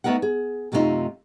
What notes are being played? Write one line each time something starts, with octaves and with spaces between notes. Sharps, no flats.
A3 B3 D#4 A#4 F#5
G#4
F#2 C3 A3 B3 D#4 F4